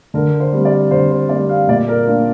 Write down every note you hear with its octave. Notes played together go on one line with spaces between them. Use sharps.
D3 A#4
C5
G3 C4
D5
D3 C5
C5
G3 C4 D5
F5
A#2 D5
A#4
A#3 D4 F4